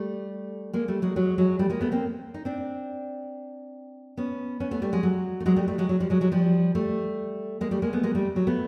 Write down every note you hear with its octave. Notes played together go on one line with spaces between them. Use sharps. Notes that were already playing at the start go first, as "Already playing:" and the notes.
Already playing: G3 A3
G#3 A#3
G3 A3
F#3 G#3
F#3 G#3
F#3 G#3
G3 A3
G#3 A#3
A3 B3
A#3 C4
D#4
C4 D4
B3 C#4
B3 C#4
A3 B3
G3 A3
F#3 G#3
F#3
A3
F#3 G#3
G3 A3
G3 A3
F#3 G#3
F#3
F3 G3
F#3 G#3
F#3 G#3
F3 G3
G3 A3
G#3 A#3
G3 A3
G#3 A#3
A3 B3
G#3 A#3
G3 A3
F#3
A3 B3